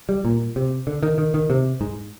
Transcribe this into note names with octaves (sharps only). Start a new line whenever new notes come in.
G3
A#2
C3
D3
D#3
D#3
D#3
C3
G#2